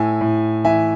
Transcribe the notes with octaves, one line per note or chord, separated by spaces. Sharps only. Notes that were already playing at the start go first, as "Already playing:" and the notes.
Already playing: A2 E5 G#5
A2
E3 E5 G#5